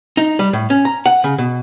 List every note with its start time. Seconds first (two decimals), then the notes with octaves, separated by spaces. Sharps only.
0.17 D#4
0.39 G3
0.53 A2
0.70 C#4
0.85 A#5
1.06 F#5
1.24 C#3
1.38 B2